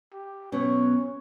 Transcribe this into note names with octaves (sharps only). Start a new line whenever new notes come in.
G4
B2 F#3 B3 C#4 C#5